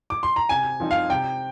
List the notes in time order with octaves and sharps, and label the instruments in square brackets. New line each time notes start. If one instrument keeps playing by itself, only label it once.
[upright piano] D6
C6
A#5
C3 G#5
F3 C4 D#4
F5
C3 G5